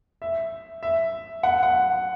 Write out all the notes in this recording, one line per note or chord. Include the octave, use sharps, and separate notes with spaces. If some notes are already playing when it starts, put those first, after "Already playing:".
E5
E5
F#5
F#5